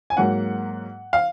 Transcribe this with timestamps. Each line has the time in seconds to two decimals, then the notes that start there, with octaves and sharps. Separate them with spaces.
0.10 G#5
0.17 G#2 F#3 A#3 F#5
1.13 F5